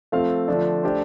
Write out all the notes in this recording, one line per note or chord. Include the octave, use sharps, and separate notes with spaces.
F3 A3 C4 A4 F5
D3 F3 A3 D4
A3 D4 G4 C5